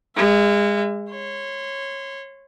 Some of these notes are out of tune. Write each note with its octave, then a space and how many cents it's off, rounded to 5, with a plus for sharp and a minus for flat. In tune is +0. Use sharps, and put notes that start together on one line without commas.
G#3 -25 E5 +35
C#5 -20 C6 -30